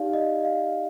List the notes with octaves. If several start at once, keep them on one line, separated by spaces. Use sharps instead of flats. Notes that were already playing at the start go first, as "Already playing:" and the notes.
Already playing: D#4 G4 D5 F5
D#5
F5